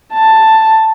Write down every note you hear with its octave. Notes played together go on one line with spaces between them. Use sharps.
A5